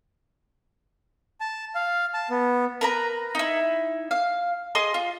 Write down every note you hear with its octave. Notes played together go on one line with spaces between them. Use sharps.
A5
F5
A5
B3
A#4 B4 A#5
D#4 E4
F5
G#4 D#5 C6 D#6
F4